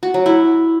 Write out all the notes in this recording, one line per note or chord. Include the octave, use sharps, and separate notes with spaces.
F#4
F#3
E4